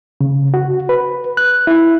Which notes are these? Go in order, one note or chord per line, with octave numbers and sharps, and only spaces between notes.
C#3
F#4
B4
F#6
E4